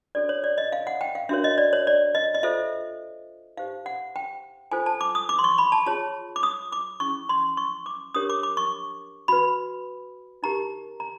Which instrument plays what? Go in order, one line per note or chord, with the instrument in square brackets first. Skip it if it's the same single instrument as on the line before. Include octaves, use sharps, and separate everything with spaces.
[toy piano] D4 F#4 A4 C#5 D5
C#5
D5
D#5
F5
F#5
G5
F5
D4 F#4 A#4 C#5 E5
D#5
D5
C#5
D5
D#5
D#5
F4 A4 C5 E5
D#4 G4 C5 F5
F#5
G5
F4 A4 C5 G#5
A5
D6
D#6
D6
C6
C#6
B5
A5
F4 G#4 C#5 A5
D6
D#6
D6
C#4 E4 G#4 C#6
C6
C#6
D6
D4 G4 A#4 C#5 D#6
D6
D6
C#6
F#4 B4 B5
D#4 G4 A#4 A#5
A#5